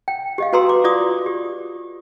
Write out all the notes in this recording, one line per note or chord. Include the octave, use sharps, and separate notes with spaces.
G5
G4 D#5 F5
F#4 A4 B4 A#5 C6 E6
D6
F4 D5 D6 D#6
G4